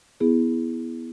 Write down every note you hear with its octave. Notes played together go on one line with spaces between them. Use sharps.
B3 E4 G#4